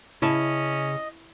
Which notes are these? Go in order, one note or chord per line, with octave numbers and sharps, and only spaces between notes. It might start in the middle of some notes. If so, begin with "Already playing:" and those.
C#3 C#4 E4 D#5 E5 A5